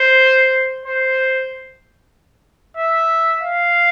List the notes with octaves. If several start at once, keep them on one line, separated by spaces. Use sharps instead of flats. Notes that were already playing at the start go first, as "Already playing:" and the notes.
Already playing: C5
C5
E5
F5